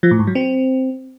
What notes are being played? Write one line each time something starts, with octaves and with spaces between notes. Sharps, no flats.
F3
A2
G#2
F#3
C4